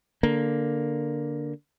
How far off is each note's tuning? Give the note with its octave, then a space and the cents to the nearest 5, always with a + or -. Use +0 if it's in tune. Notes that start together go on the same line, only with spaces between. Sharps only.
D3 -5 A#3 +0